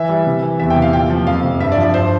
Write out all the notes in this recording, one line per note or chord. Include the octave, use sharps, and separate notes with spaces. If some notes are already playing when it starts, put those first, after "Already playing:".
Already playing: E3 E5
G3
C3
E3
E2 E5
G5
C3
F5
A#2 G5
F3
F2 F5
C3
G2 E5
D5
F3
D5
G2 C5